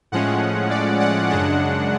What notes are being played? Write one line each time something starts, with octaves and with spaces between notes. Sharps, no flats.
A2 F3 G#3 C#4 F#5
D5
F#5
F#2 C#3 G#3 D4 F#5